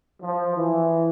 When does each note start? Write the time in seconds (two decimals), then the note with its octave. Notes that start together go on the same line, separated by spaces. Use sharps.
0.23 F3
0.56 E3